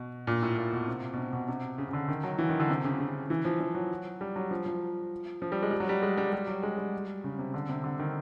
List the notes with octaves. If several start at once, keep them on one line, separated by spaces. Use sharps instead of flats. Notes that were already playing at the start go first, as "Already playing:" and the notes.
Already playing: B2
A#2
A2
A#2
B2
C3
B2
C3
B2
C3
C#3
C#3
D3
D#3
F#3
E3
D#3
D3
C3
C#3
C#3
E3
F3
F3
F#3
G3
F#3
F3
F3
F3
G3
G#3
G3
F#3
G3
G#3
G3
G3
F#3
G#3
G3
C#3
C3
D3
C3
D3
D#3